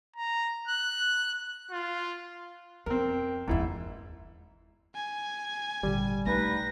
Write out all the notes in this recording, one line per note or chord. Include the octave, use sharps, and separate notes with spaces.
A#5
F#6
F4
F2 C4 A#4
F#1 E2 G#2 E4
G#5
G#1 A#2 D3 G3
B1 G2 A3 D#4 B4 A#6